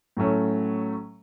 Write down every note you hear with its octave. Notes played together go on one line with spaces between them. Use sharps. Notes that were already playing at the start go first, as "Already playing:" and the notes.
A2 F#3 A3 C#4